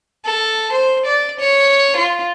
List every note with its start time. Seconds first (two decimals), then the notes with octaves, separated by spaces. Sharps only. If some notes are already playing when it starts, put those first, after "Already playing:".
0.25 A4
0.72 C5
1.05 D5
1.39 C#5
1.96 F4